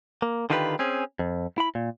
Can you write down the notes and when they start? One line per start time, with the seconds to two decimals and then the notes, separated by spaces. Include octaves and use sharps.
0.22 A#3
0.50 D3 D#3 F4 G4 G#4 B4
0.79 C4 C#4 G#4
1.19 F2
1.58 E4 B5
1.75 A#2